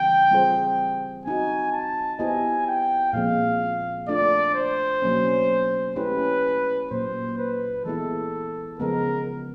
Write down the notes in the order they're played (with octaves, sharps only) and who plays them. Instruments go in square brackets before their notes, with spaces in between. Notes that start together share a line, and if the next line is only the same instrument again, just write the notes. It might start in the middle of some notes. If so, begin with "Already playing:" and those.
Already playing: [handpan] C#3 E3 G3 C4 [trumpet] G5
[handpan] G3 C4 F4 G#4 C5
[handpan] C4 D#4 F#4 [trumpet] G#5
[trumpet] A5
[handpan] B3 E4 G4 C5 D#5 [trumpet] G#5
[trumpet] G5
[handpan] A#2 F3 G#3 C4 [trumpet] F5
[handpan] A3 D4 F4 [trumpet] D5
[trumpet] C5
[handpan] B2 F#3 A#3 C#4
[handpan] A3 C#4 E4 G4 [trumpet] B4
[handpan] A#2 F#3 A#3 [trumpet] C5
[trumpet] B4
[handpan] E3 G#3 B3 E4 [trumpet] A4
[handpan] C#3 F3 G#3 B3 [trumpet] A#4